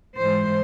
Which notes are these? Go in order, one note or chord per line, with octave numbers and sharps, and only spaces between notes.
G#2 E3 G#3 C5